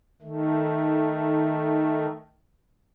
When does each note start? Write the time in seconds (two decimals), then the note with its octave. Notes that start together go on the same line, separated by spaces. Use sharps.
0.22 D#3 A3